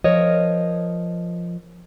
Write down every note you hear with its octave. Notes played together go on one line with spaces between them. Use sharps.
F3 A#4 C#5 D#5